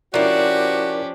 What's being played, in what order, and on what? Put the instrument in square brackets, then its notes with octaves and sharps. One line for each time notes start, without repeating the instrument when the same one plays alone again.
[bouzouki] F3 D4 [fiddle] C#4 G4 [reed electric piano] E4 A#4 D5 [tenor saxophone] F#4